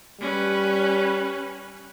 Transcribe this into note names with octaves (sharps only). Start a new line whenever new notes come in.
G3 C#4 B4